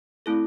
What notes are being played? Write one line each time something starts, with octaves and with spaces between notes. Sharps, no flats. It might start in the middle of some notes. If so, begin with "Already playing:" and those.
A3 C4 E4 A4